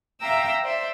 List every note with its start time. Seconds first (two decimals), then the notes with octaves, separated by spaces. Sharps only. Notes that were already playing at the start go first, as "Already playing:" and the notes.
0.20 E5 F5 G5 A#5 D6 E6
0.63 C5 D5 E5